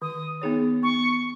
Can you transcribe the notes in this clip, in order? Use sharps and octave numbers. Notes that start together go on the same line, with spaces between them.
D#3 D#6
B3 D#4 G#4 C#5
B3 C#6